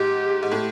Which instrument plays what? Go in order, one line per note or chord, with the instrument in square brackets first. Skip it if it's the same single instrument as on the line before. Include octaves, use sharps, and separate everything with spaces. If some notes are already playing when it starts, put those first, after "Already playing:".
Already playing: [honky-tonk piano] G#2 [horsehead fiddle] G4
[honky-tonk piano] G#2
A2